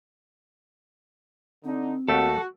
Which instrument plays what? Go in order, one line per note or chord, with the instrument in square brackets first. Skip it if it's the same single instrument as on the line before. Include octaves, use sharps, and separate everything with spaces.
[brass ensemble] D3 D#4 [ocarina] C4
[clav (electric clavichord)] D#2 A3 G4 [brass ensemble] F#4 [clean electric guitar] A4